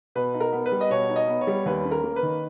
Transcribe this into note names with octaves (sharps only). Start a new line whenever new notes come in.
B2 B4
D#4
A#4
B3
B4
G3
D#5
B2 C#5
D#4
D#5
B3
C#5
G3
D#2 B4
C#4
A#4
A#3
B4
D#3